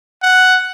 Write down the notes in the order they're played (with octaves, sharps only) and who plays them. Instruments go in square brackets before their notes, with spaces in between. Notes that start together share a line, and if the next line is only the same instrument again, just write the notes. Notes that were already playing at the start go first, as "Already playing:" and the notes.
[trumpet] F#5